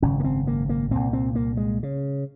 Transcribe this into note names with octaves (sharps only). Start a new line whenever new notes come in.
G#1 F#2 C#3 C#4
A#3
C4
A#3
A#3
C2 A#2 C4
C4
A#3
G#3
C#3